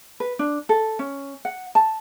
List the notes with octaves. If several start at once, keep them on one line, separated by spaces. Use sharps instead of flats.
B4
D4
A4
C#4
F#5
A5